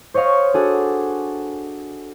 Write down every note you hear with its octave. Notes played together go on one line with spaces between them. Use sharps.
C5 C#5 D#5 F5 C#6
D4 F#4 G#4 A4